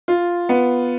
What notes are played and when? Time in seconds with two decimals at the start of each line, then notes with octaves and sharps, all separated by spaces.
0.08 F4
0.49 B3